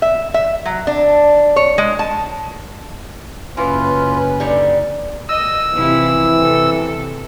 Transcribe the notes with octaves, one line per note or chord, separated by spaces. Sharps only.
E5
E5
F#3
D4
C#5
G#3
A5
F#1 E3 C#4 F4 B4
D3 G3 D#4
D#5 E6
C3 E3 F3 E4
C3 A4